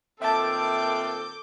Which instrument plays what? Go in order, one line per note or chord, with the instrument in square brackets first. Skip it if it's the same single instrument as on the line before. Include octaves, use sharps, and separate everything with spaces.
[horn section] A#2 D#3 C4 [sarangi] A4 [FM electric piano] E5 A5 [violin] D6 G6